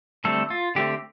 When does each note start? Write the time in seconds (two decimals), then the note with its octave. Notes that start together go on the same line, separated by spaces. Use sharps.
0.24 D3 G3 A3 C4 A4
0.50 F4
0.75 D3 A3 C4 G4